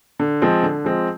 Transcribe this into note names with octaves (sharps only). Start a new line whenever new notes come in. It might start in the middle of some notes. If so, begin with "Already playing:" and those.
D3
F3 G#3 C4
D3
F3 G#3 C4